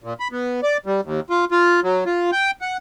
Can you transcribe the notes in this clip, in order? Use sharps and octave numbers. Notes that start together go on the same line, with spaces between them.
A#2
B5
B3
D5
G3
D#2
F4
F4
F#3
F4
G5
F#5